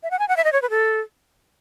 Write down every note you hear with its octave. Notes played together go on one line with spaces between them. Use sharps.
E5
F#5
G#5
F#5
E5
D#5
C#5
B4
A4